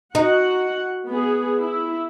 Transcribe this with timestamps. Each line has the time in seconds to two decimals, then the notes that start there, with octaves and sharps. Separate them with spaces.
0.15 D#4 F#4 F#5
1.06 B3 G#4
1.59 E4